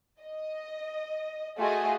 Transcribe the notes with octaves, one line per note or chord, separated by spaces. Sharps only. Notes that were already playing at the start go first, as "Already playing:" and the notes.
D#5
A3 F4 F#4 G#4 D#5 G#5